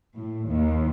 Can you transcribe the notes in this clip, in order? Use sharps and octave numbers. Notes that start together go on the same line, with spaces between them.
A2
D#2